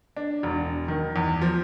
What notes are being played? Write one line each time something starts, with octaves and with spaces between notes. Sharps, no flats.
D4
E1
D#3
E2
F3